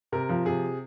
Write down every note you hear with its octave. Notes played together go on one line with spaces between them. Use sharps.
C3 A#4
F3
C3 G#4